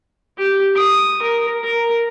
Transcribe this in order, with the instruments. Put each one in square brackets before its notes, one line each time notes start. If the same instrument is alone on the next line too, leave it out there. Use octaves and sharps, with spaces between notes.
[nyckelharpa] G4
D#6
A#4
A#4